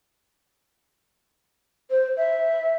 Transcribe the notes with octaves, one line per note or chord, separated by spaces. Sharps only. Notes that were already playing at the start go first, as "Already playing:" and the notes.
C5
E5